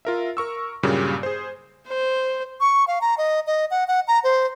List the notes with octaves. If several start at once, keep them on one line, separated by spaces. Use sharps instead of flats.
F4 A#4 E5
A#4 C#6 E6
G2 A#2 C#3 F#3 G3 A#3
G#4 C5
C5
C#6
F5
A#5
D#5
D#5
F#5
F#5
A#5
C5